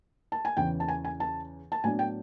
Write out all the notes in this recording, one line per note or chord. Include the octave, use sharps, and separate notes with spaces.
A5
G#5
E2 C#3 E3 G5
A5
G#5
G#5
A5
A5
A2 F#3 B3 D4 G#5
G5